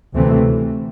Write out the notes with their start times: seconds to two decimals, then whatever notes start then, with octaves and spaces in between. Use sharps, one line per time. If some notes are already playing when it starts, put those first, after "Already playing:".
0.13 D2 C3 E3 A3 C4